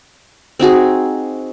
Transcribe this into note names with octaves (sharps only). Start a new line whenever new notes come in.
C4 D#4 F#4 G#4